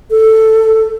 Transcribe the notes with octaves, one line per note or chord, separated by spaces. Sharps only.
A4